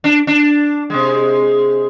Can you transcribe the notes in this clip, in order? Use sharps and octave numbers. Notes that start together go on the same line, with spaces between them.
D4
D4
C3 G#3